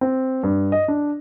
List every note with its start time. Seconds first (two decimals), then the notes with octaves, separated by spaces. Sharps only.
0.01 C4
0.43 G2
0.72 D#5
0.88 D4